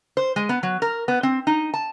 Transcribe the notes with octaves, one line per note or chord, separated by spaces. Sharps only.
C5
G#3
B3
F#3
A#4
B3
C4
D#4
A5